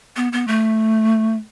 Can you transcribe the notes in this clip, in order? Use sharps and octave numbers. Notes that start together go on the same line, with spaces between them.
B3
B3
A3